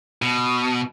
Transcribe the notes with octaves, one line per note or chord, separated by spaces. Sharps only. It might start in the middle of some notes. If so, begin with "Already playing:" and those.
B2